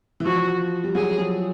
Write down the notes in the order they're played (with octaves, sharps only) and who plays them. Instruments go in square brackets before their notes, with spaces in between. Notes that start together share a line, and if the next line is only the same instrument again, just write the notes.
[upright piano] E3
[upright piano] F3 [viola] F#4
[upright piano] G3
[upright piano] F#3 [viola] G#4
[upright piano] F3